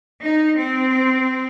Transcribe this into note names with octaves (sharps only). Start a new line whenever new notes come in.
D#4
C4